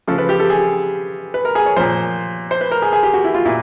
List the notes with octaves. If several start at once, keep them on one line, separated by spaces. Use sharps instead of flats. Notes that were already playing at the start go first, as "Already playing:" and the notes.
C#3 F3 A4
B4
G4
A4
G#4
B4
A#4
G#4
C#5
A#2 F3 C5
C5
B4
A#4
G#4
G#4
G4
F#4
E4
F4
A#2 E4